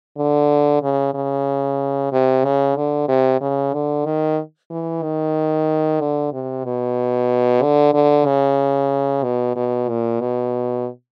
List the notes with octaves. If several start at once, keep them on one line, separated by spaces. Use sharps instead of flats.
D3
C#3
C#3
C3
C#3
D3
C3
C#3
D3
D#3
E3
D#3
D3
C3
B2
D3
D3
C#3
B2
B2
A#2
B2